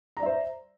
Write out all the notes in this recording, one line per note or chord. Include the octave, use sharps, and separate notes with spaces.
C5 D5 E5 A#5